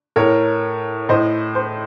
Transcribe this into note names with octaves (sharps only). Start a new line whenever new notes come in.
A2 A#4 C#5
A2 C5 D#5
C5